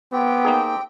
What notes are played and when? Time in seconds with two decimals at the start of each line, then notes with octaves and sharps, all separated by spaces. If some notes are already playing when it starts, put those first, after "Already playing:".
0.13 B3 C4 G4 G5
0.45 A#3 D#4 G#4